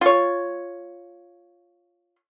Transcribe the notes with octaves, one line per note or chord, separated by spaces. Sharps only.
F4 C#5